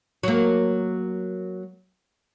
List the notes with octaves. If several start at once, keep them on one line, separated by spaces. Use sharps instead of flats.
F#3 A#3